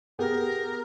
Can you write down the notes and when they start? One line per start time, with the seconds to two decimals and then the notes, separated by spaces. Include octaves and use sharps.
0.19 B3 G4 G#4 A#4